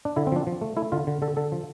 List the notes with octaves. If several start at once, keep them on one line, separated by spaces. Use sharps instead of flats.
D4
D3 E4
C4
F3 D4
F3
A3
A3 E4
D3 F4
D3
D3 A4
D3 A4
F3